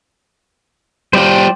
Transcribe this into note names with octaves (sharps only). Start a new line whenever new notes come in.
G3 F4 C5 D5 G5